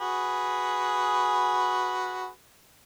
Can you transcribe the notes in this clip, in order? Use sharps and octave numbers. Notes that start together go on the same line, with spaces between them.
F#4 G#4 B4